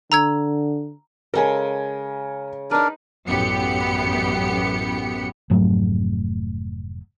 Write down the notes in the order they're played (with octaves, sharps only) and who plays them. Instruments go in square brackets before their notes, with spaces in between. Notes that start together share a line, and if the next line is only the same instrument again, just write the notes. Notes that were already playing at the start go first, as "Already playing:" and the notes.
[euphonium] D3 [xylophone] A#5 E6 G#6
[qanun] C#3 G#3 A4 [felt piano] A#4 G#5
[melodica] D4 A#4 [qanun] D#4 B4
[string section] A1 F#2 B3 G4 C#7
[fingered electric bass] F1 G#2 F#3 A3